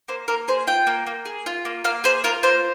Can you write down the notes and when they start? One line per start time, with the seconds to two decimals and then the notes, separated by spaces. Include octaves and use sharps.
0.08 A#3 C5
0.28 A#3 A#4
0.48 G#4 C5
0.67 F4 G5
0.87 A#3
1.07 A#3
1.25 G#4
1.46 F4
1.65 A#3
1.84 A#3 F5
2.04 G#4 C5
2.24 F4 A#4
2.43 A#3 C5